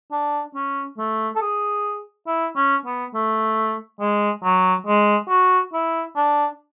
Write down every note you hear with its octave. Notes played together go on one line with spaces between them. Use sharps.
D4
C#4
A3
A4
G#4
E4
C#4
B3
A3
G#3
F#3
G#3
F#4
E4
D4